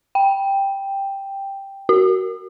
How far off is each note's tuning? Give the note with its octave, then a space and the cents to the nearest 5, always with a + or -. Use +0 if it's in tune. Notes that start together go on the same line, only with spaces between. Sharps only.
G5 +5
F#4 +20